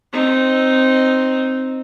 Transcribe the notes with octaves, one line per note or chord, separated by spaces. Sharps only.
C4 D#4